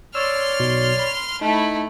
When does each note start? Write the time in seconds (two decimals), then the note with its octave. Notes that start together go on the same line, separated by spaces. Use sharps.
0.15 C#5 D5 C6 E6 F6
0.60 B1 B2 F#3
0.99 B5
1.41 A3 D#4 E4 B5